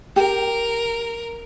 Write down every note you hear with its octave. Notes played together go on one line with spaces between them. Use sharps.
G4 A#4